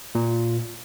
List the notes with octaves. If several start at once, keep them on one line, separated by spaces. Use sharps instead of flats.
A#2